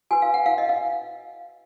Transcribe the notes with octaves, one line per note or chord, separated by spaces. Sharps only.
F#4 B4 G#5
F5
F#5
F5
D#5
F5